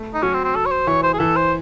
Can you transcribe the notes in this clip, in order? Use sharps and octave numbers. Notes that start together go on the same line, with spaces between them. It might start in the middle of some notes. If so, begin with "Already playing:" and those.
Already playing: A3
D#4
F#3 C#4
C4
C4
A4
C#5
C5
E3 C#5
C5
G#4
E3 A4
C5